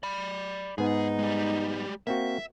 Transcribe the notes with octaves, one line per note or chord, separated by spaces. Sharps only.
D5 B5
G#2 B3 D#4 G#4
G3 G#3
A#3 C4 F#4 E5